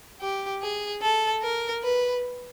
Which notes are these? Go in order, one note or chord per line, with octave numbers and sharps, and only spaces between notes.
G4
G#4
A4
A#4
B4